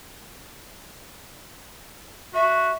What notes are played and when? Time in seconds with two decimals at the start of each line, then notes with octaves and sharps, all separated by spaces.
2.34 F#4 E5